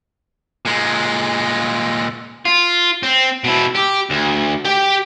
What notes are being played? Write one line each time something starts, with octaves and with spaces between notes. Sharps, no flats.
A#2 G#3
F4
C4
B2 E4
G4
D2
G4 G5